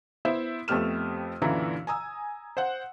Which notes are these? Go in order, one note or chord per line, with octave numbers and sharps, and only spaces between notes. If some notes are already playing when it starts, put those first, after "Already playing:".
B3 E4 C5 E5
F2 A3 B3 G4 F6 E7
F#2 A#2 D3 E3 E4 A#5
G#5 A#5 D#6 E6
C5 F#5